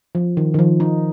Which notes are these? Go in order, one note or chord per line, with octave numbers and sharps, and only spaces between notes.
F3
D#3
D#3
F3
D#4